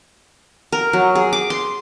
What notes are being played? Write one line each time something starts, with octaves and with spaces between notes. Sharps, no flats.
A#4
F#3
G#4
D6
C6